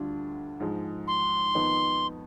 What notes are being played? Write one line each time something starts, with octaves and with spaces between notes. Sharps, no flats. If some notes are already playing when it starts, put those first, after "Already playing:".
Already playing: D2 D3 G3 D4 F4
G#2 F3 G#3
C6
F2 D#3 B3 D#4